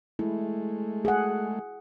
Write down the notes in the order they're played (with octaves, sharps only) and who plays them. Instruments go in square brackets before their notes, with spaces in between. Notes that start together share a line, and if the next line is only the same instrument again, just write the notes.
[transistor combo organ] G#3 A3 [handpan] E4
[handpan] G#4 F#5